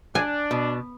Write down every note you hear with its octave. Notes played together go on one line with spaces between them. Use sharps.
D4 G#5
B2